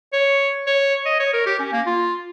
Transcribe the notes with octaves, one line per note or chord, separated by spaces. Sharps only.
C#5
C#5
D#5
C#5
A#4
G4
C#4
A#3
F4